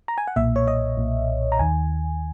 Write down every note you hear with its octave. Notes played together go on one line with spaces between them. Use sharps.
A#5
G#5
F#5
B1 A#2 E5
C#5
D#5
B1 A#2
A#5
D#2 D#3 G#5